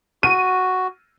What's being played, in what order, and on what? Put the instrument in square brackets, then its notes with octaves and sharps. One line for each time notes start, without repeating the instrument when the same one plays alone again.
[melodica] F#4 [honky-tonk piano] D#7